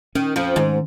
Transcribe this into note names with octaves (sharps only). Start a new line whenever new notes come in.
D#3 C#4
F2 F3
G#2 D#3 G#3